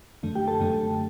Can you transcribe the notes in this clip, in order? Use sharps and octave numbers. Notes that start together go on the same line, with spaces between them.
F#2 D3 A3
G4 G5
A4 A5
F#2 D3 A3